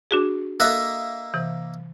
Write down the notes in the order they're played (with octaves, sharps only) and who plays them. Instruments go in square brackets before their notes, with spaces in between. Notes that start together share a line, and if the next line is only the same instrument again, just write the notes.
[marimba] D4 F#4 G#4
[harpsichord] A#3 D#5 E5 [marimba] A4 F#6
[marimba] C3 E3